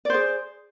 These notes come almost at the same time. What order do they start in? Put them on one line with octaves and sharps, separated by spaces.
D5 C5 G#4